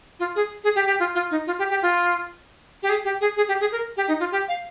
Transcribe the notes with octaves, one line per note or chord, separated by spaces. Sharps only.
F4
G#4
G#4
G4
G4
F4
F4
D#4
F4
G4
G4
F4
G4
G#4
G4
G#4
G#4
G4
G#4
A#4
G4
D#4
F4
G4
F5